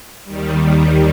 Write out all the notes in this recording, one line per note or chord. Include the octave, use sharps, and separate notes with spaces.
D#2 D#3 G3
D#2 D#3 G3